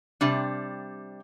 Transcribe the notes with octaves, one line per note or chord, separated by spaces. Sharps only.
C3 G3 D4